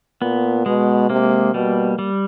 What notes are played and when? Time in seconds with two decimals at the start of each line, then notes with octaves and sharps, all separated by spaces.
0.21 A#2 B3
0.66 B2 G#3
1.10 C3 A#3
1.54 B2 G3
1.99 G3